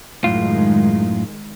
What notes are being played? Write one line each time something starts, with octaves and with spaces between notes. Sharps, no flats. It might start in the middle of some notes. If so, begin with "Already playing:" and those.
F#2 A2 D#3 G#3 F4